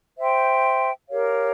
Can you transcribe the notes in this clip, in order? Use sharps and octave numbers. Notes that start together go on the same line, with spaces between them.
C5 E5 G5 C6
G4 A#4 C#5 F5